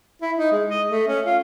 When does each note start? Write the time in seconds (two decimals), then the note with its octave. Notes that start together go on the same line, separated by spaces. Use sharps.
0.22 E4
0.38 D#4
0.52 G#3
0.70 D#5
0.90 A3
1.08 C#4
1.26 F4